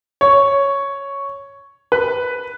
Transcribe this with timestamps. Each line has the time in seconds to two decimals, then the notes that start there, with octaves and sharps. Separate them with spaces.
0.21 C#5
1.92 B4